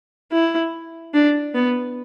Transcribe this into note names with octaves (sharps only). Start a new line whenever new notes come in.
E4
D4
B3